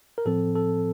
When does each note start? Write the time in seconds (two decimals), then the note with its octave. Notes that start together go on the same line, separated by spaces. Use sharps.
0.18 A#4
0.25 A2 F3 C4 A4
0.55 A4